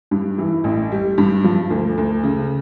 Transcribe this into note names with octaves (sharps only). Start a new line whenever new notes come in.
G2
E3
A1
G3
G2
F3
D2
D2
C#3